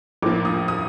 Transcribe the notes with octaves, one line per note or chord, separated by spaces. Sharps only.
A#1 A2 F3 A#3 D6
D#6
D#6